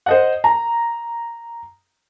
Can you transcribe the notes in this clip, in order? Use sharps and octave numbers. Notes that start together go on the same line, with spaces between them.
C5 D#5 F#5
A#5